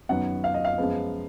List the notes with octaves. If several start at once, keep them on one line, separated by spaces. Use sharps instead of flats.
F#2 D#3 F#3 B3 F#5
F5
D#5
F5
F#2 F3 G#3 B3